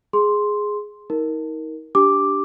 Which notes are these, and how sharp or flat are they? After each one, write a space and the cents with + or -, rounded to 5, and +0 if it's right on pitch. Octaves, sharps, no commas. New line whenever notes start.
G#4 +0 C6 +0
D#4 +35 A#4 +0
D4 +0 G4 +0 D6 +0